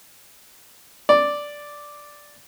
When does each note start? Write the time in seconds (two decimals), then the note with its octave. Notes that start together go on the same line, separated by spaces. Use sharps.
1.09 D5